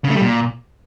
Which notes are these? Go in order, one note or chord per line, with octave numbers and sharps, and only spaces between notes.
C#3
A3
G3
A#2